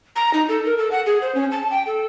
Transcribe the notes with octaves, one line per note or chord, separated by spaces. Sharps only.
A#5
D#4
A4
A#4
A4
F#5
G#4
C5
C#4
A5
G5
A4